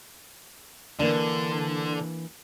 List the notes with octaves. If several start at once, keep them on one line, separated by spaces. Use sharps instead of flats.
D3 E3 A#3 D4